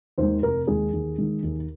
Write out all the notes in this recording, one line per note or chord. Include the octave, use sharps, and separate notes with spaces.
D#2 D#3 G#3 C5
F1 A#4
D#2 D#3 G#3 G#4
D#2
D#3 G#3
D#2